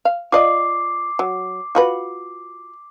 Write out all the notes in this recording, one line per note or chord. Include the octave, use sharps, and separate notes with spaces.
F5
F4 D5 D#5 D6 C7
F#3
F4 F#4 B4